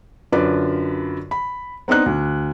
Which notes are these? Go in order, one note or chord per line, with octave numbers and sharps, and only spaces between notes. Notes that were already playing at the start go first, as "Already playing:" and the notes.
F#2 D3 D4 F4 B4 D5
B5
B3 C4 D4 D#4 F#6
D2